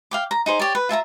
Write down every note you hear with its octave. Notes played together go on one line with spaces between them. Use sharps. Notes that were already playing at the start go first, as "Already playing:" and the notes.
F5 G5 D6
A#5
D#4 G#4 C5
G4 C#5 D5
B4
F4 E5 G#5 A#5